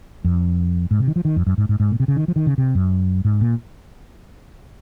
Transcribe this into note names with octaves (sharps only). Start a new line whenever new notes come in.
F2
G#2
C3
D#3
F3
D#3
F2
F#2
G#2
G#2
G#2
A#2
C3
C#3
D#3
F3
D#3
C#3
C3
F#2
G#2
A#2